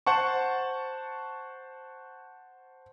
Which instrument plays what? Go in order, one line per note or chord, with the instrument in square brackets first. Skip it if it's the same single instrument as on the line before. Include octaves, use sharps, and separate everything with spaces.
[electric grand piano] C5 F#5 A5 C#6